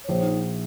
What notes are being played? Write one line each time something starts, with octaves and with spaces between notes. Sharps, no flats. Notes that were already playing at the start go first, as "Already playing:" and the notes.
C#5
A#1 C5
D#4